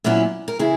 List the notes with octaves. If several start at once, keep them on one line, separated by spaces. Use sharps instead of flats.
A#2 F#3 B3 C#4 E4
A#4
C#3 E3 E4 G#4